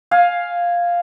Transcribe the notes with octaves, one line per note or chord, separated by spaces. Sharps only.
F5 G#5